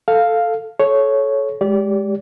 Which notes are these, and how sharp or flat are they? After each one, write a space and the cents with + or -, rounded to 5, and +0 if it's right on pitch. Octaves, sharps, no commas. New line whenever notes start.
A4 +0 F5 +0
A4 -30 C#5 +0
G#3 +0 G4 +0 D5 -30